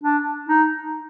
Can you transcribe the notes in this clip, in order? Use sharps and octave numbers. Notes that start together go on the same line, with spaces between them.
D4
D#4